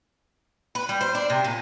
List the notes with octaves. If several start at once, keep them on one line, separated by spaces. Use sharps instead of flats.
B4
G3
C5
D4
C3
A#2